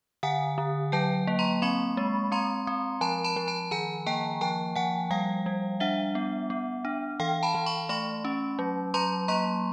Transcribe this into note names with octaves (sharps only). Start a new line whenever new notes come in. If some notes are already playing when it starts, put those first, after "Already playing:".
D3 F#5 G#5
D3
F#3 G5 A5
A#3
A#5 C6
C4 B5 C#6
G#3
C4 A#5 C6
C4
F3 A5 B5
A5 B5
F3
A5 B5
D#3 G#5 A#5
A#3 G5 A5
F3 G5 A5
F3 F#5 G#5
G3 F5 G5
G3
D4 E5 F#5
B3
B3
D4
E3 F5 G5
A5 B5
E3
B5 C#6
A3 B5 C#6
C#4
F#3
F#3 A#5 C6
A#3 A#5 C6